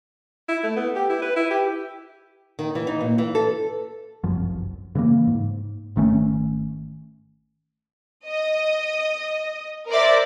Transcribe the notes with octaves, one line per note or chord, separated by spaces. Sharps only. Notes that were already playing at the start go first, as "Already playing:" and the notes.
E4
A3
B3
G4
E4
B4
E4
G4
D#3
E3
D#4
A#2
E3
A4
G1 C2 F#2 F3
C#3 E3 G#3 A#3
G#2
G#1 D#3 A3 C#4
D#5
A#4 C5 D5 E5